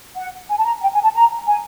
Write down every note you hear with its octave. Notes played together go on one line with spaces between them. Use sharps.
F#5
G#5
A5
A#5
G5
G#5
A5
A#5
G#5